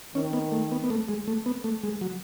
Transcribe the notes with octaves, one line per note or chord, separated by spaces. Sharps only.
D#3 C#4
B3
A3
B3
B3
A3
G#3
A3
B3
A3
G#3
F#3